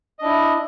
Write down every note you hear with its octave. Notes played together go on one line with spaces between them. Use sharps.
D4 E4 D#5